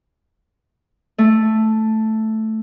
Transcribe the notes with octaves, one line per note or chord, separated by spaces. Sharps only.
A3